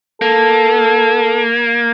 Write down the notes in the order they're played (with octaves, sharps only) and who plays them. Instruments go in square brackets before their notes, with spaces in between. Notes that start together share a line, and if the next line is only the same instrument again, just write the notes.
[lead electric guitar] A#3 [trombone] A4